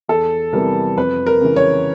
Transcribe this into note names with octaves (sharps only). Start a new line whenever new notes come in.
E2 A4
C3 E3 G3 B3 A#4
F2 B4
A#4
C#3 E3
C#5